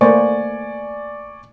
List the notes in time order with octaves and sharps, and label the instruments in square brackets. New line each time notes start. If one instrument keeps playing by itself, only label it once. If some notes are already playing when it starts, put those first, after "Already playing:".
[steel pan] A3 A#3 C5 [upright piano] D5 G#5 C#6